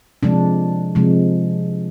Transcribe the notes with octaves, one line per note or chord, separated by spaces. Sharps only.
C3 F3 G#3 D4
C3 F3 G#3